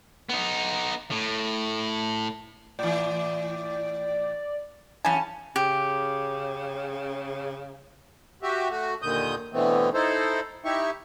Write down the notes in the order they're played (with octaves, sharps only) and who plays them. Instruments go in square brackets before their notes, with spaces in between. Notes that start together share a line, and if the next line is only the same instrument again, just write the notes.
[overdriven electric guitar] B3 D#4
A2
[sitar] A2 E3 [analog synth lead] D5
[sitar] F#2 E3 C#4 [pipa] C#3 G#5 [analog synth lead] A5
[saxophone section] C#3 [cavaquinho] G4
[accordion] F#4 G4 E5
A3 F#4
D#2 A#2 D3 D#3 D#6 G6
B2 D3 E3 A3 B3 C4
D#4 E4 A4 C5
D#4 E4 G4 E5 C#6